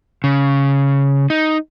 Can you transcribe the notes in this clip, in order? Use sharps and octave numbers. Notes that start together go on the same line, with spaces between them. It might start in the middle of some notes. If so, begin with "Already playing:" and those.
C#3
D#4